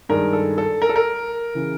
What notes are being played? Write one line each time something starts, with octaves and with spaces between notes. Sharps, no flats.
G2 D#3 G#3 A#4
A4
A4
A#4
A4
A#4
C#3 E3